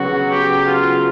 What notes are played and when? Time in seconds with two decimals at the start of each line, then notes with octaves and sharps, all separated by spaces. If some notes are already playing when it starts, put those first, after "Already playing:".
Already playing: C#3 F#3 B3 F#4
0.28 G4
0.65 F4